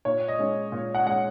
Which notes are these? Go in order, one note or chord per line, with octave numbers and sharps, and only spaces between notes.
A#2 C#5
D#5
G#3 C#4
A#2
F#5
G#3 C#4 F#5